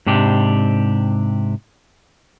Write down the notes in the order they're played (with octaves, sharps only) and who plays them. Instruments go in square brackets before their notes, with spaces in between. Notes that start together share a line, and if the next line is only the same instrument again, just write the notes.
[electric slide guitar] G#2 C3 D4 G4